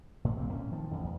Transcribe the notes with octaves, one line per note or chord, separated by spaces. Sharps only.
A2
B1 A#3 C4
A2 C#4
D#3 F3
A1 F2
E2